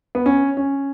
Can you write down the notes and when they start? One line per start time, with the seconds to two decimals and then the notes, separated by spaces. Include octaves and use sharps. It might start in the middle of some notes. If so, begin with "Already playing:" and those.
0.15 B3
0.26 C#4
0.57 C#4